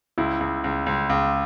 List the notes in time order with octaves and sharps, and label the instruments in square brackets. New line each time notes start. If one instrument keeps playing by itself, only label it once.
[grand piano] C#2 E4
C#2
C#2
C#2
C#2